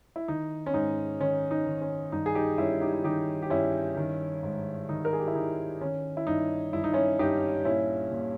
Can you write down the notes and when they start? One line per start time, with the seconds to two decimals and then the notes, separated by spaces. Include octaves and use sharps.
0.16 E4
0.28 D#3 D#4
0.66 C#4
0.74 G#2 D#4
1.20 D#3 C#4
1.51 D#4
1.66 D#3
1.81 C#4
2.12 G2 D#4
2.26 G#4
2.35 D#4 G4
2.58 G2 C#4 E4
2.82 D#4 G4
2.94 E4
3.04 D#3 D#4 G4
3.42 G4
3.50 G2 C#4 E4
3.97 D#3
4.43 G#2
4.89 D#3 D#4
5.05 A#4
5.13 G#4
5.20 G4
5.28 E4
5.35 D#3 D#4
5.81 D#3 C#4
6.17 E4
6.27 G2 D#4
6.73 G2 E4
6.84 D#4
6.93 C#4 E4
7.19 G2 D#4 G4
7.65 A#2 C#4 E4
8.11 A#2